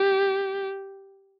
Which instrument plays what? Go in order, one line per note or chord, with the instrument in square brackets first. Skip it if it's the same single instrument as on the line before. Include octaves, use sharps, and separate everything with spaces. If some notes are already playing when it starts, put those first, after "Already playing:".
Already playing: [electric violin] G4